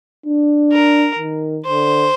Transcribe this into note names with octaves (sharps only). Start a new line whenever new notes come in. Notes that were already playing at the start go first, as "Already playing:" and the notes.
D4
A#4
D#3
D3 C5